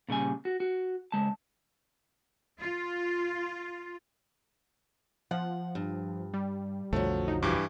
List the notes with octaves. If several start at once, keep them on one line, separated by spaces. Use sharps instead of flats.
A#2 C#3 G3 G#5
F#4
F#4
C#3 G#3 A5
F4
F3 F#5
G2
G3
B1 F2 D3 F3 F#3 A3
D#4
G2 E3 G4 D6